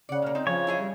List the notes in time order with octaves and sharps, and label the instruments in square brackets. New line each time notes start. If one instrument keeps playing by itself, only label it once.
[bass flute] C#3 [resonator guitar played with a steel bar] D5 F#5
[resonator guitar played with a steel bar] B2 A#3
[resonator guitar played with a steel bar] C4 [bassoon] D#4
[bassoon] C#3 [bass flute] F3 [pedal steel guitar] C#5
[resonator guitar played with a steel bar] E4 G#4 D#5
[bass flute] G3